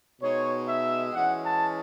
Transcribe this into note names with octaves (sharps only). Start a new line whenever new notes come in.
B2 G#3 D#4 C#5
E5
E3 G#3 C#4 F#5
A5